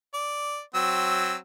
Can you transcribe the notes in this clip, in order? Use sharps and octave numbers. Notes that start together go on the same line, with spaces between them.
D5
F#3 C4 E6